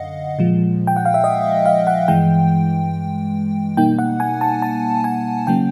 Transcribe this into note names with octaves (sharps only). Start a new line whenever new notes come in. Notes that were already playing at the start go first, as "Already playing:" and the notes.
Already playing: F#2 D3 D#5 F5 F#5
A#2 F3 G#3
G5
F#5
F5
E5
D#5
F5
F#5
G2 E3 G#3 G5
B2 G3 A#3 D#4 G5
F#5
G#5
A5
A5
G#5
C#3 F#3 A#3 C#4 G5